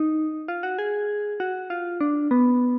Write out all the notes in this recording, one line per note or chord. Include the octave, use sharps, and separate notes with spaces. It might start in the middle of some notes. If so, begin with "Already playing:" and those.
Already playing: D#4
F4
F#4
G#4
F#4
F4
D4
B3